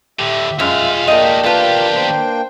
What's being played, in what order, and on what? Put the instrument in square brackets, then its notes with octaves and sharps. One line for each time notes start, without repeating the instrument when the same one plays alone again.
[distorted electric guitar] A2 D3 [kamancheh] G4 [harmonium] E5
[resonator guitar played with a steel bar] F#2 [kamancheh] G#3 F4 [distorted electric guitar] G4 F5
[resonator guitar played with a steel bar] A3 D#5 [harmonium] A#3 D4 G5
[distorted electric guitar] E2 G4 [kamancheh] F4 [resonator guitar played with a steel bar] B4 A5
[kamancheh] C5